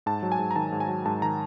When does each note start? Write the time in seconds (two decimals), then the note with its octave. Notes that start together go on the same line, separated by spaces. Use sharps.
0.06 G#2 A5
0.23 F#3
0.32 G#5
0.39 G#2
0.51 A#5
0.56 D#3 A5
0.72 G#2
0.80 G#5
0.88 F#3
1.06 G#2 A5
1.22 D#3 A#5